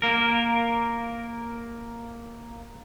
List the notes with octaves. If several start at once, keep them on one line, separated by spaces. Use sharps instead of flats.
A#3 A#4